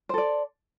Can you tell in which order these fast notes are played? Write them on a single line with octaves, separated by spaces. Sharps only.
C5 A4 D5